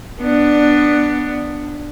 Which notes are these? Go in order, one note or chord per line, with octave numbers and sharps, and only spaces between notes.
B3 D4